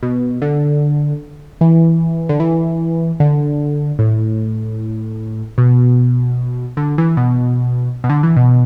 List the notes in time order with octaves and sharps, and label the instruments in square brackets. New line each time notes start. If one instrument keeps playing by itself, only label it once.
[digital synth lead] B2
D3
E3
D3
E3
D3
A2
B2
D3
E3
B2
B2
D3
E3
B2